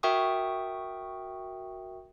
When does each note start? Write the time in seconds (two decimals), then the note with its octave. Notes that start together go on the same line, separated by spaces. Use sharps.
0.03 F#4 A#4 E5 G5 C#6 D#6